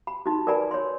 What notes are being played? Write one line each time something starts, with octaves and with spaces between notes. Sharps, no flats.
B5
D#4 F#4
A#4 B4 D5 G#5 B5
C#5 C6